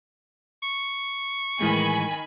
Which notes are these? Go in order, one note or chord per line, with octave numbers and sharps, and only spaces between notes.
C#6
A2 D#3 E3 G#3 G#5 B5